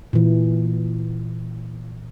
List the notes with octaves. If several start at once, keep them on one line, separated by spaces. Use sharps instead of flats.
A#2 E3